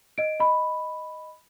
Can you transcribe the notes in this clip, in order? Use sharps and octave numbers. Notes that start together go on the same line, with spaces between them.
D#5 D7
D#5 B5